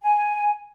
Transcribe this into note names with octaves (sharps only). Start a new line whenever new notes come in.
G#5